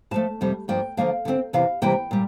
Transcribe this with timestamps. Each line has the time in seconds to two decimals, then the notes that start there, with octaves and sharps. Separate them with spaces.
0.11 A2 F3 A3 A5
0.41 F2 C3 G3
0.68 G2 F3 A#3 D4 G5
0.97 D3 F3 A#3 D4 F5
1.25 D3 A3 C4
1.53 E2 C3 E3 F5
1.82 C3 E3 G3 A#3 G5
2.11 A#2 G3